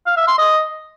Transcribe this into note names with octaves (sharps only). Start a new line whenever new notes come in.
F5
E5
C6
D#5